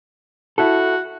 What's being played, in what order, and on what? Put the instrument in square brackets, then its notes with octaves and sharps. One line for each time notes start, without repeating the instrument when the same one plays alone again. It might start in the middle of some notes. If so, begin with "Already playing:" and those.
[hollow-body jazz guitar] E4 A4 [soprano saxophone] F#4